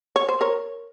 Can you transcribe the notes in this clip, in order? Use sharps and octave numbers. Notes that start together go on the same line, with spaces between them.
C#5
C5
A#4 C#5